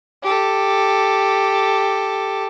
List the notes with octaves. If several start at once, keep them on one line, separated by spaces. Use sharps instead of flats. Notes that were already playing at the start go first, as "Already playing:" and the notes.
G4 A4